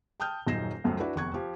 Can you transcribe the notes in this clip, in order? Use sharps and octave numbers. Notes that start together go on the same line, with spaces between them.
G5 A5 D#6 F6 G6
D#1 F#2 D#4 A#6 C7 E7
C#2 F#2 F3 A3
D4 E4 F#4 B4
F1 E2 C#6 F#6 G#6
F3 G4